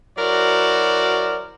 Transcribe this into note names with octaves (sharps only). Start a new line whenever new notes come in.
F#3 E4 F#4 A#4 C5 D5